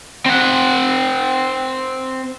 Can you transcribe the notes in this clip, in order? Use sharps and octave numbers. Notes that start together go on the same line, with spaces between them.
C4 F#5